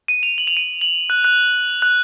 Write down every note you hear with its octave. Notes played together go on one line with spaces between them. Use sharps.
D#7
F7
F#7
F7
D#7
F#7
F#6
F#6
F#6